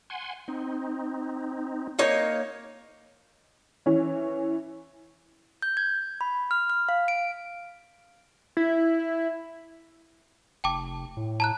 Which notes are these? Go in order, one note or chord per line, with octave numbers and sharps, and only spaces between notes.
F#5 G#5 C6
C4 D#4
A#3 D#4 C#5
E3 C#4
G6
G#6
B5
F6
F6
F5
D7
E4
F1 G5 A5 D6
A2
A5 A#5 F#6